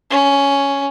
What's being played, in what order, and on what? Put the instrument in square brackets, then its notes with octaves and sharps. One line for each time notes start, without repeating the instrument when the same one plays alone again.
[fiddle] C#4